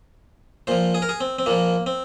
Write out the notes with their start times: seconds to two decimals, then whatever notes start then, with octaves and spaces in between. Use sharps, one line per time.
0.67 A#2 F3 C5
0.94 G#4
1.02 A#4
1.09 G#4
1.21 C4
1.39 C4
1.46 A#2 F3 A#3
1.86 C4